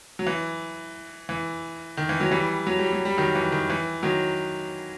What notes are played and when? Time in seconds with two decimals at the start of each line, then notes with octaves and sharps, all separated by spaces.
0.19 F#3
0.26 E3
1.29 E3
1.97 D#3
2.09 E3
2.20 D#3 F#3
2.31 E3 G3
2.67 F#3
2.79 G3
2.93 F#3
3.05 G3
3.18 D#3 F#3
3.35 E3
3.52 D#3
3.70 E3
4.03 D#3 F#3